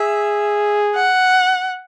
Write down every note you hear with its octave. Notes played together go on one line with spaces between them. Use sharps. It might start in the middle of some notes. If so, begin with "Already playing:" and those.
Already playing: G#4 E5
F#5